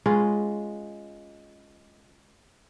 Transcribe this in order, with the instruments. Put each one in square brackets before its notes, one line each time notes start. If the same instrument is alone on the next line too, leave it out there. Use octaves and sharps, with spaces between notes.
[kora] G#3 C#4 F4 B4